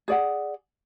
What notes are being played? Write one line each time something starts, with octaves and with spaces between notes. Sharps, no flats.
G#4 D5 F#5